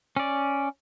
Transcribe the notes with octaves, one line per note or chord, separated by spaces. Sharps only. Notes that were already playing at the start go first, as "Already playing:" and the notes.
C#4 D5